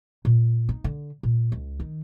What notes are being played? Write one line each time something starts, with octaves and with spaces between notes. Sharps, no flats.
A#2
D#4
D3
A#2
C#2
D#3